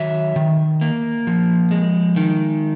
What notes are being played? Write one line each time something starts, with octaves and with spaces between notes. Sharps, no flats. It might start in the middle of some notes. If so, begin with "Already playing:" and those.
Already playing: D#3 F#3 E5
D#3
A#3
F3
G#3
D#3